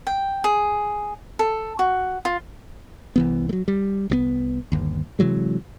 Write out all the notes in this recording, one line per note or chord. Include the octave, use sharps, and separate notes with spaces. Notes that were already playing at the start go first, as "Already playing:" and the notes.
G5
G#4
A4
F#4
F4
C2 E3 B3
F#3 A3
G3
C2 E3 B3
G1 D#2
C3 E3 F#3 G#3